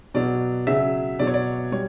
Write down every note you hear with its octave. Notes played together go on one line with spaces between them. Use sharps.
B2 F#3 D5
C#3 F#3 E5
B2 F#3 D5
C#5
D5
G3 C#5